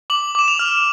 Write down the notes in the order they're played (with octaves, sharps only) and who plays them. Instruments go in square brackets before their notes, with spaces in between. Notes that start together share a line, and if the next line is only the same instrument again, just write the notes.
[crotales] D6 F#7
D6 E7
F7
F6